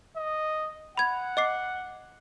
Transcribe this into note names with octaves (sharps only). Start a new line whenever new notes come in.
D#5
F#5 B5 G#6
D#5 D6 C7